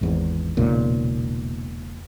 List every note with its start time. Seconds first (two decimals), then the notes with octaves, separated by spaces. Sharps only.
0.01 G#1 E2
0.57 E1 B1 A#2 C#3